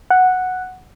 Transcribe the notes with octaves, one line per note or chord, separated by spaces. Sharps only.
F#5